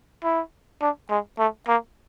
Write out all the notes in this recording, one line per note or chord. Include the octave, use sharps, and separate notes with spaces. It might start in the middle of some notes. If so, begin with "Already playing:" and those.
E4
D4
G#3
A3
A#3